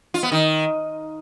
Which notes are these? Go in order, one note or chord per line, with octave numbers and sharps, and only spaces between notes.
F4
B3
D#3